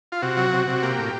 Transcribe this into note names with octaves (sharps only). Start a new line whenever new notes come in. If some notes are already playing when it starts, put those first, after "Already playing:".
F4
C3 F#4
F#3
C3
C3
A#3 G4
A2